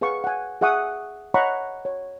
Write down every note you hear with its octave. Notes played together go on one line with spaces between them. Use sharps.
G#4 B4 F5 F#5 C#6
F#5 G#5
G#4 E5 F#5 C#6 D#6
C#5 D#5 F#5 A#5 B5 C#6
C#5